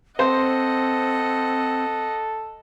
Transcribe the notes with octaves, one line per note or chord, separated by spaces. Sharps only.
C4 A4 C5 D#5 F#5